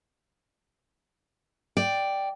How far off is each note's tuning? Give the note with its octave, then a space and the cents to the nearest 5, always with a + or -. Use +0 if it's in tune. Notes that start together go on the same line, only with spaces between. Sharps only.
D5 +0 G5 +0